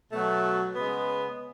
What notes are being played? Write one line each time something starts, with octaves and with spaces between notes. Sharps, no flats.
B2 F#3 A3
C#3 G#3 B3